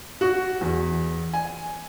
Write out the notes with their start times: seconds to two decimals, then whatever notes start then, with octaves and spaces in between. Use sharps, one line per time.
0.21 F#4
0.61 E2
1.33 G#5